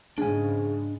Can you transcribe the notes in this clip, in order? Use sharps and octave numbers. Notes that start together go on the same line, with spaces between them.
G#2 C#3 G#3 D4 G#4 G#5